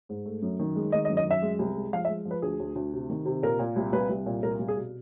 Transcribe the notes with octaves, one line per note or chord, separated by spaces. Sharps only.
G#2
A3
F#2
D#3
G#3
D#3 D#5
D#5
F#2
D#5
F#2 E5
G#3
C2
G#3
F3 F5
E5
G#3
F3
B4
D2 G#4
D2
D2
C3
D#3
C3
A#2 A#4
A#2
C2
C2 B4
C2
A#2
C2 A#4
C2
G#4
B2